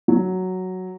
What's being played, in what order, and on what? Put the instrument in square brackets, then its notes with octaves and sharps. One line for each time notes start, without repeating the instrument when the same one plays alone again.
[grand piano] F#3